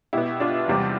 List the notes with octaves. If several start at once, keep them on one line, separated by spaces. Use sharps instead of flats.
B2 B3 E4 G4
D4 F4
E2 C3 G3 C4